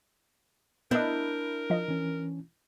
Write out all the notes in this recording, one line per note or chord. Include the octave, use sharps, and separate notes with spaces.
B3 D4 E4 A#4 D#5 G6
F3 D#5
E3 C#4